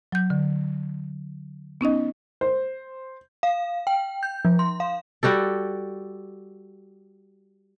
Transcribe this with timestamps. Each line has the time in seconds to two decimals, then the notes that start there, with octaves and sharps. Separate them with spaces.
0.12 F#3 G6
0.30 D3
1.81 B3 C#4 D#4 D#5
2.41 C5
3.43 F5
3.87 G5
4.23 G6
4.45 F3
4.59 C6
4.80 F5
5.23 G3 F#4 G4 A4